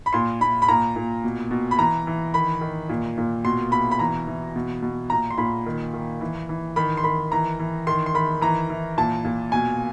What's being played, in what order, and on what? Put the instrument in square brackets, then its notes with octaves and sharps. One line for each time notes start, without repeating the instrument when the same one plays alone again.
[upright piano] B5
A#2 C6
A#2 B5
B5
A#2 A#5
A#2
B2
B2
B5
E3 A#5
E3
D#3 B5
D#3
A#2
A#2
B2 C6
B2 B5
B5
E3 A#5
E3
B2
B2
A#2 A#5
C6
A#2 B5
D#3
D#3
E3
E3
D#3 B5
C6
D#3 B5
E3 A#5
E3
D#3 C6
C6
D#3 B5
E3 A#5
E3
A#2 A5
A#2
B2 G#5